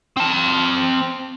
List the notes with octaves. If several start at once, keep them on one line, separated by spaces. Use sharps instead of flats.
C4 A5